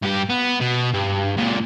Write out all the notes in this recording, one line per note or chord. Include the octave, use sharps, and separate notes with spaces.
G2 G4
B3
B2
G2
C#2 A#2